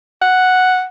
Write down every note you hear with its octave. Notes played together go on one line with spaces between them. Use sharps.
F#5